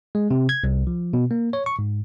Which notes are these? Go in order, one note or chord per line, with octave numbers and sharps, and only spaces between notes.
G#3
C3
G#6
C2
F3
B2
A#3
C#5
C#6
G#2